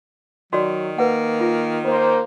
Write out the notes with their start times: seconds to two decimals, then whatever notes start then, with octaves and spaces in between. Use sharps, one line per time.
0.53 D#3 F#3 F#4 D5
0.98 A#3 B4 F#5
1.40 F4
1.84 A#3 C5